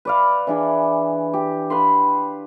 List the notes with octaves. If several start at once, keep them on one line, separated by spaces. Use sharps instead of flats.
B4 D5 F5
E3 D4 G#4
G4
B4 F5 B5 C6